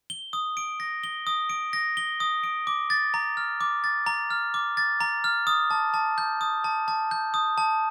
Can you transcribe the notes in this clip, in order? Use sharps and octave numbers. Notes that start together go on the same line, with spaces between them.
G7
D#6
D7
A#6
G7
D#6
D7
A#6
G7
D#6
D7
D6
A6
A#5
F6
D6
A6
A#5
F6
D6
A6
A#5
F6
D#6
A5
A5
G6
D#6
A5
A5
G6
D#6
A5